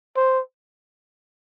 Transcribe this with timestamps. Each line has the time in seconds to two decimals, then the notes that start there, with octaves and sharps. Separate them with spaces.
0.16 C5